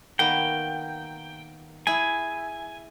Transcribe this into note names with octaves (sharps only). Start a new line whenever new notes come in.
D#3 A#3 B3 G5
E4 G#4 G#5